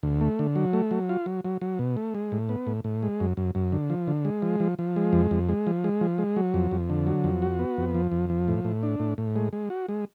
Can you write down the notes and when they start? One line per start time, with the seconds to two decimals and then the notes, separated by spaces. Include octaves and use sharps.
0.03 D2
0.21 A3
0.39 D3
0.56 F#3
0.73 A3
0.91 F#3
1.09 F4
1.26 F#3
1.45 F#3
1.61 F#3
1.79 B2
1.97 A3
2.15 G#3
2.32 A2
2.49 B3
2.67 A2
2.84 A2
3.03 G#3
3.20 F#2
3.37 F#2
3.55 F#2
3.72 D3
3.90 F3
4.08 D3
4.25 G#3
4.42 F3
4.60 F3
4.79 F3
4.96 G#3
5.13 F2
5.31 F2
5.49 G#3
5.67 F3
5.84 G#3
6.01 F3
6.18 G#3
6.36 F#3
6.54 F2
6.71 F2
6.90 D3
7.07 F#3
7.24 F2
7.42 F#4
7.59 B3
7.77 F2
7.95 F3
8.12 F2
8.30 F3
8.48 A2
8.64 A2
8.83 D4
8.99 A2
9.18 A2
9.36 G#3
9.53 G#3
9.70 F#4
9.89 G#3